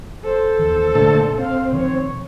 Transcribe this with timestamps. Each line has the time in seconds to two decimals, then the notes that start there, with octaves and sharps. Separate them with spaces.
0.24 A4 C5
0.59 D#2 D#3 E3
0.95 A#2 D3 A3 A5
1.38 C4 F5
1.72 B2 D#3 F3 C#5